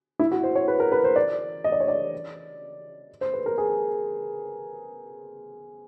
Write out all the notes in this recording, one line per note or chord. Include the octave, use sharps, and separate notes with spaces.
E4
F#4
C5
C#5
B4
A#4
B4
C5
D5
D#5
D5
C#5
D5
C5
B4
A#4
G#4